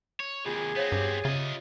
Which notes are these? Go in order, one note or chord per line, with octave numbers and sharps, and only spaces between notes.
C#5
D#2 C3 F4 G#4 G#5
B3 C4 C5 C#5 F5
G2 G4 D6
C#3 F4 D#5 E5